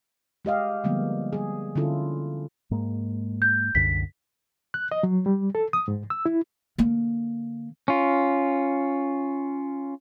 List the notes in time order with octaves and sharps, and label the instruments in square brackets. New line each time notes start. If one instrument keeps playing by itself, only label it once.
[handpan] G#3 G4 D#5 F5
D3 F3 G3 G#3 A#3 B3
G3 G#4
D3 C#4 E4 F4 A4
[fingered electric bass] G#2 G#3 A#3
[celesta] G6
[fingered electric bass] C2 F#2 D3 [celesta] B6
[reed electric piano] F#6
D#5
F#3
G3
A4
D#6
G#2
E6
E4
[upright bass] D3 A#3
[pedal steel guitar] C#4 F4